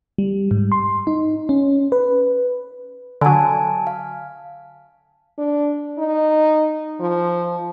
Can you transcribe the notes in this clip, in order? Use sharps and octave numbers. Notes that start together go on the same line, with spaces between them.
G3
G#2
C6
D#4
C#4
B4
D3 F#3 G#5 A5
F5
D4
D#4
F3